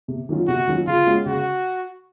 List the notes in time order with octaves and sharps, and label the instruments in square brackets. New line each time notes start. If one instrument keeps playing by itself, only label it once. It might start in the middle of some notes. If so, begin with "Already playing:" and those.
[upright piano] C3
D#3 F#3 C#4 F4
[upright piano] C3 [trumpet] F#4
[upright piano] D#3 F#3 C#4 F4
[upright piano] C#3 [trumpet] F4
[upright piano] G#3 C#4 F#4
[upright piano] C#3 [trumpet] F#4